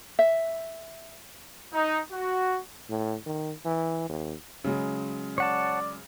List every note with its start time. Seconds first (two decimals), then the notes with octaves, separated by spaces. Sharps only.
0.19 E5
1.74 D#4
2.12 F#4
2.90 A2
3.26 D#3
3.65 E3
4.10 D#2
4.64 C#3 F#3 G#3
5.38 C#5 D5 F#5 A5